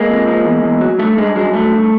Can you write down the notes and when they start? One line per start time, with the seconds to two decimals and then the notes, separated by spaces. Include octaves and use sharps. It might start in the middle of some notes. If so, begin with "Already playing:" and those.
Already playing: G#3 A#3
0.10 F2
0.27 F3
0.45 E2
0.63 E2
0.81 F#3
0.99 G2 A3
1.17 G2 G#3
1.35 F#3 G#3
1.53 G2 A3
1.71 G2